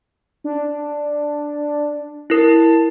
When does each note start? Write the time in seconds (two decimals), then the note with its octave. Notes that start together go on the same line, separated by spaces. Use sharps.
0.44 D4
2.30 E4 A#4 A5